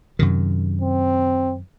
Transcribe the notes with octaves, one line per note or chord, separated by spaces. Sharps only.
F#2 C3 D#3
C4